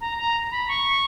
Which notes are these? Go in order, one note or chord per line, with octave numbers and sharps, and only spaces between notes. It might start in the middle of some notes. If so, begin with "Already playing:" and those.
A#5
A#5
B5
C#6